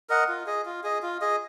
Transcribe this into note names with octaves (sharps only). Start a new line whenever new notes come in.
A#4 D#5 F#5
F4
G#4 D#5
F4
G#4 D#5
F4
G#4 D#5